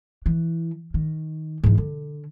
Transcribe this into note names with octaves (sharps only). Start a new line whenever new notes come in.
E3
D#3
G#2 E3
D3